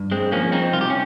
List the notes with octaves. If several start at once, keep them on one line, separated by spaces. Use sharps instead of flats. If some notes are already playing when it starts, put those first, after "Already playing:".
Already playing: G2
G#3 C4
F3 A#3 C#4
C4 D#4
C2 F4
G4
C#4